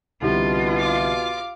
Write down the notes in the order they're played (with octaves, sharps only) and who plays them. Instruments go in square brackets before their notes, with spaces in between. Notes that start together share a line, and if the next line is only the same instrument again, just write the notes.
[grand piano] C2 D3 E3 [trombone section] B2 B3 [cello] F4
[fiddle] F5 D6